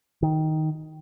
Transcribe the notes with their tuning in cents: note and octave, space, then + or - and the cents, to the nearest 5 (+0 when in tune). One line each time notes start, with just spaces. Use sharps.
D#3 +5